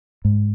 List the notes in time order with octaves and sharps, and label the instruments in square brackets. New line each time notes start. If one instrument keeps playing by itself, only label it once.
[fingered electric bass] G#2